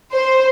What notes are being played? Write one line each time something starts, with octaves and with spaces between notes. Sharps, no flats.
C5